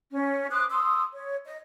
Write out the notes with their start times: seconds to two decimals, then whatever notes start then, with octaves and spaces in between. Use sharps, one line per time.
0.13 C#4
0.50 C5 D6 D#6 F#6
0.71 C6 D#6 E6
1.14 C#5
1.46 D#5